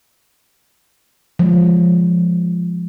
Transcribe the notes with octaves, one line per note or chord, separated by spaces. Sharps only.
F3 G#3